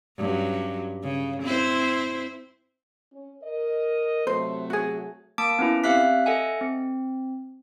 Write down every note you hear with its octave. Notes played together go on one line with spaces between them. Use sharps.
G2 F#3 C#4
C#3
C4 E4 C5
C#4
A#4 D#5
C3 F#3 A3 C5
F#4 G#4
A#3 A5 D6 D#6 D7
B3 C#4 E4
C4 G4 E5 F5 F#6 B6
A4 D#5 E5 F#5 G#5
C4